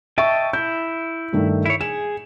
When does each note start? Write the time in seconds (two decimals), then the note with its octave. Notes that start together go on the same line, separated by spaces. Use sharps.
0.18 D#5 E5 G5 A5 C#6
0.53 E4 G6
1.33 G2 D#3 A3
1.66 E4 C#5
1.81 G#4 E7